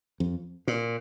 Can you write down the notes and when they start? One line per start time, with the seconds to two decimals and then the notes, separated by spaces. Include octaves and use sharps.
0.20 F2
0.68 A#2